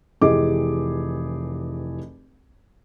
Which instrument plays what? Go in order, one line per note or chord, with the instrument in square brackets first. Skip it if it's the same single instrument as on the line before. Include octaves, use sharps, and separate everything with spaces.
[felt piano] F1 E3 G4 G#4 D#5 D6